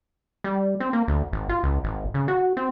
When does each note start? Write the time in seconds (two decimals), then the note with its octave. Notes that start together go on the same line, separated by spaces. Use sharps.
0.44 G3
0.80 C4
0.93 A#3
1.08 D2
1.33 G#1
1.49 F4
1.63 C#2
1.84 G#1
2.14 C#3
2.28 F#4
2.57 C4